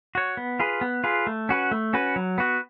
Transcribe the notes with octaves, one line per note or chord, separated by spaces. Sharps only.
F#4 C#5
B3
F4 G#4 B4
B3
F4 G#4 B4
A3
C#4 F#4 B4
A3
C#4 F#4 B4
F#3
B3 F#4